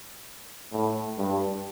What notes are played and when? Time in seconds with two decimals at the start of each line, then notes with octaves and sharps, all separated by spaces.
0.72 A2
1.18 G2